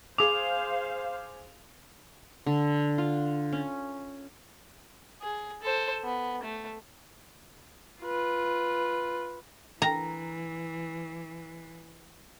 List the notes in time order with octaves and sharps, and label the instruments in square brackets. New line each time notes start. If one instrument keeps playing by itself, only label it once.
[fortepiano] G#4 D6 [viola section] C5 F5 [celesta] F7
[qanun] D3
F4
C#4
[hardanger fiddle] G#4
A4 C5
B3
A3
[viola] F4 B4
[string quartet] E3 [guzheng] A#5